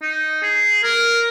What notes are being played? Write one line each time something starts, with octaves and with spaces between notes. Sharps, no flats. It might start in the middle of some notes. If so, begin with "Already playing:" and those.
D#4
G#4
A#4